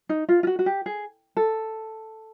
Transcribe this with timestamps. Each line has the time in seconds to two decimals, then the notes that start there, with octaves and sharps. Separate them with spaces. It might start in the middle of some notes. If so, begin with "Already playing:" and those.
0.09 D#4
0.29 F4
0.43 F4
0.47 F#4
0.59 F#4
0.66 G4
0.86 G#4
1.37 A4